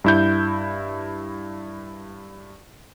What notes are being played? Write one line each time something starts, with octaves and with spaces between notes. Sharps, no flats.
G2 E4 G6